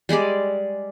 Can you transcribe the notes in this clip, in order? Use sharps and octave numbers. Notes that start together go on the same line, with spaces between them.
G3 G#3 G#4 D5